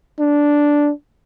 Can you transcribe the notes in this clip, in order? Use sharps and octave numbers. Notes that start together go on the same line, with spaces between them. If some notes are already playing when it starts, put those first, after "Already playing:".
D4